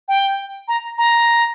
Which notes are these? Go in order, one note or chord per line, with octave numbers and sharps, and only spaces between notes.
G5
A#5
A#5